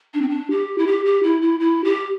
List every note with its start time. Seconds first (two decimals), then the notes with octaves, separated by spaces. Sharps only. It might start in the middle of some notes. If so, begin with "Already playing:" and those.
0.14 D4
0.22 C4
0.29 D4
0.51 G4
0.78 E4
0.87 G4
1.05 G4
1.23 E4
1.42 E4
1.60 E4
1.84 G4